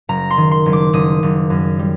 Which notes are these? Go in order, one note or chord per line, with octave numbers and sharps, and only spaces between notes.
F#1 A#5
C6
D#3
C6
F#1
D6
F#1 D#6
F#1
F#2
G3